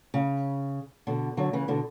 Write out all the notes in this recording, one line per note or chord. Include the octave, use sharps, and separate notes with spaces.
C#3
B2 D3
D3 F#3
C#3 E3
B2 D3